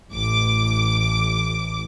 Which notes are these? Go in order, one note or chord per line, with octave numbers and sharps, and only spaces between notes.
A1 D6